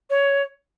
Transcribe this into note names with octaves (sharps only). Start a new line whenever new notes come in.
C#5